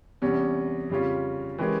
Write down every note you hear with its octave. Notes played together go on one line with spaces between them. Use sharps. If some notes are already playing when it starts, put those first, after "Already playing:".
E2 C3 G3 C#4
F2 C#3 G3 C#4 F4
E3 G#3 C#4 G4 A#4